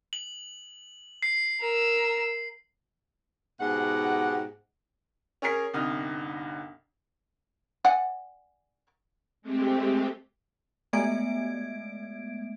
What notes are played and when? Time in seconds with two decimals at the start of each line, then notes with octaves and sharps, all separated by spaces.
0.13 F#7
1.22 C7
1.61 A#4 E6
3.60 G#2 B2 G4 F#5
5.42 C#4 G#4 A#4 C7
5.74 G1 C2 D#4 D#6 F6
7.85 D5 F#5 G#5
9.42 G#3 A3 C4 G4
10.93 G#3 A3 B3 E5 G#6 D7